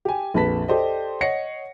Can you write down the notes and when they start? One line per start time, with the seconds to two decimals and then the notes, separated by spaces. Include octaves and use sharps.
0.05 G4 G#5
0.34 A#1 F2 B4 A5 B6
0.68 G4 A4 C5 D5 D#5
1.21 C#5 D#5 F#5 A#6 C7 C#7